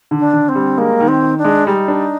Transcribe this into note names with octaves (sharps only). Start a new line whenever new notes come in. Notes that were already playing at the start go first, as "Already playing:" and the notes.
D3
D4
D3
C4
G3
G#3 A#3
D#3
C4
D#3
D4
G#3
G3 D#4
D4